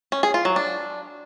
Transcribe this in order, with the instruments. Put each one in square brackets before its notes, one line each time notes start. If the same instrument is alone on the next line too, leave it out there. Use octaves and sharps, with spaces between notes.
[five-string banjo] C#4
G#4
F4
F#3
D4